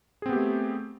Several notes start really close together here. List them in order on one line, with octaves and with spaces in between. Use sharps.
G#4 C4 B3 G4 A3